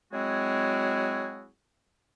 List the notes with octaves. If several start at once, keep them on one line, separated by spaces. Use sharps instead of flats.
F#3 G#3 C4 E4 F#4 G#4